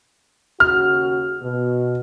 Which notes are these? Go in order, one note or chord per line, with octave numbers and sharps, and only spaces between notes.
D#2 C#3 F#4 F6
B2